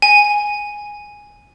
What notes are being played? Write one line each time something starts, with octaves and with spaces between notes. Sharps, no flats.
G#5